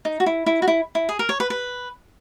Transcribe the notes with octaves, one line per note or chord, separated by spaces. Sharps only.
D#4
F#4
E4
E4
F#4
E4
E4
G#4
A#4
C#5
B4
B4